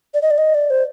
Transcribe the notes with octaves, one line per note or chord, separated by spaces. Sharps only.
D5
D#5
D5
D#5
D5
C5